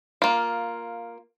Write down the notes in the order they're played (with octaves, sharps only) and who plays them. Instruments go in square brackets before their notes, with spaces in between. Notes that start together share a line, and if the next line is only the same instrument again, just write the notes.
[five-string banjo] A#3 F4